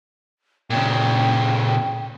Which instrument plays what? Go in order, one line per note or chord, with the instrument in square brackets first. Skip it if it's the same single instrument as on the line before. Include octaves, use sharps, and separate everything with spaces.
[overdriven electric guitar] A#2 C#3 [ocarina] G5